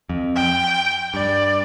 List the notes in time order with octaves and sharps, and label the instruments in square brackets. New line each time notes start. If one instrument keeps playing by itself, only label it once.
[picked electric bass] F2
[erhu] G5
[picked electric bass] G2 [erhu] D5